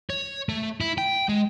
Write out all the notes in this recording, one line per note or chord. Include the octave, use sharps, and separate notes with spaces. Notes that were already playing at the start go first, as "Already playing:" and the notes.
C#5
A3
E4
G5
G#3